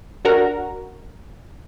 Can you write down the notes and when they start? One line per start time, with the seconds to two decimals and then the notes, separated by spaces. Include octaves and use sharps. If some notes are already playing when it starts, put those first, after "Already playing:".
0.25 D4 F#4 A#4 A#5